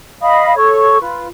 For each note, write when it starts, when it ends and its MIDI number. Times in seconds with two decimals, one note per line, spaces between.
0.21 0.53 75
0.21 0.53 77
0.21 0.53 83
0.21 0.53 87
0.56 0.98 69
0.56 0.98 73
0.56 0.98 85
1.00 1.27 65
1.00 1.27 71